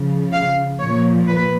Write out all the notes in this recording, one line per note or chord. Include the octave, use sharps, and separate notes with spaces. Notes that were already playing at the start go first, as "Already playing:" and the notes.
Already playing: C#3 F3
F5
A#2 F3 C#5
B4